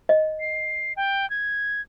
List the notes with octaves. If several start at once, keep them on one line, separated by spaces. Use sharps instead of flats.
D#5
C7
G5
G#6